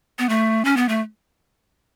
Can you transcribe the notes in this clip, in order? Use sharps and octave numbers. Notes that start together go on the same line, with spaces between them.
B3
A3
C#4
B3
A3